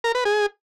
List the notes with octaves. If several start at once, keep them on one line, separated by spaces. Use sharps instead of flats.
A#4
B4
G#4